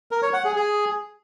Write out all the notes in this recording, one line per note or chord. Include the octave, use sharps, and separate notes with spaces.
A#4
C#5
F#5
G#4
G#4